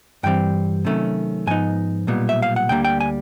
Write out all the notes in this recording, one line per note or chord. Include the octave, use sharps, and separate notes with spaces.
G2 E3 G3 C4 G5
C3 D#3 F#3 A3 C#4
G#2 F3 B3 D#4 G#5
B1 A#2 G3 B3
E5
F5
F#5
D2 D3 G3 A#3 G5
G5
G#5